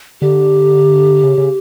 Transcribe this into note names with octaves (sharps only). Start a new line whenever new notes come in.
D3 G4
C#3
C#3